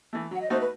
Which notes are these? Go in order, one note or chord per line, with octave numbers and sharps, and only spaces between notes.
E3 A3
F#3 F#5
D#5
A3 D#4 F#4 C5
B4